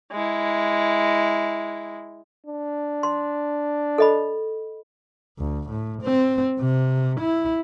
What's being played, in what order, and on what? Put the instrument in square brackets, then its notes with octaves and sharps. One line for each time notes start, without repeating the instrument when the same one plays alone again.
[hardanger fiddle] G#3 E4
[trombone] D4
[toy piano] C6
A4 D#5 B5
[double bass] D2
A2
C4
C3
E4